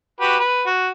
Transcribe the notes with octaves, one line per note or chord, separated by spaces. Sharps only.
F#4 G4 B4
B4
F#4